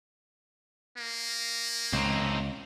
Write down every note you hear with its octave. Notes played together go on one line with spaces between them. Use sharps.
A#3
C#2 C4 D#4